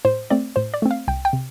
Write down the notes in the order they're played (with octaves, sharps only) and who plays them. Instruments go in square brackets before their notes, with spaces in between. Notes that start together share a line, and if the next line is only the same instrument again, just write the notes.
[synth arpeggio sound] A2 C5
A3 C4 D5
A2 C5
D5
A3 C4
F5
C2 G5
G5
C3